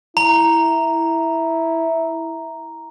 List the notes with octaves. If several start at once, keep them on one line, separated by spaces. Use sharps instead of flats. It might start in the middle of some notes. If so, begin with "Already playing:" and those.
E4 A#5